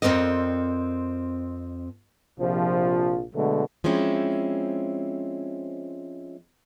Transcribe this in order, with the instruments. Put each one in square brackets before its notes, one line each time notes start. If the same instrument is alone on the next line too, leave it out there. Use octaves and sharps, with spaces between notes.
[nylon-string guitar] F2 B2 C4 A#4 D5 D#5
[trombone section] A#1 C3 F3
B2 D3 F#3 G#3 A3
[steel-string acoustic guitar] F3 G#3 C4 C#4 E4